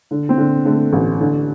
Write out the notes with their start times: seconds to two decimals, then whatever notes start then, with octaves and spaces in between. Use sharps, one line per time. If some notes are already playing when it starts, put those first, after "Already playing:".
0.11 D3
0.29 C4
0.38 D3
0.65 D3 A3
0.93 A1
1.20 D3